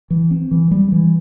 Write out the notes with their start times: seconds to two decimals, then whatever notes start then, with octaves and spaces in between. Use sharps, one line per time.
0.10 E3
0.31 C4
0.51 E3
0.71 G3
0.92 E3